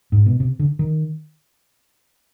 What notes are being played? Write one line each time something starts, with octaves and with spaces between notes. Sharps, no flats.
G#2
B2
C3
D3
D#3